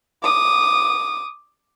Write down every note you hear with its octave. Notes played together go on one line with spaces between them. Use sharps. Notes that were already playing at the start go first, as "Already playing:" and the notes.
D6 D#6